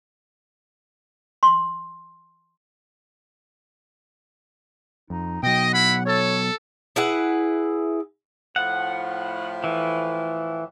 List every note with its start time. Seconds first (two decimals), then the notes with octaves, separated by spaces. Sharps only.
1.43 C6
5.10 F2 D#4
5.43 B2 F#3 D#5 G5
5.73 E4 F#5 B5
6.06 A4 C#5
6.96 E4 G#4 B4 F#5
8.56 A2 F3 F#5
9.64 E3